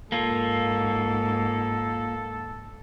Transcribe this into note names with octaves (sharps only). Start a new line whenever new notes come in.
G#2 A#3 F4 A4